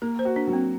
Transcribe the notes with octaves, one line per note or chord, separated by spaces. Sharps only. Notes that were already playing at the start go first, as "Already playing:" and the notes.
A#3 A#4
C5
F#4
D4
F#3
C4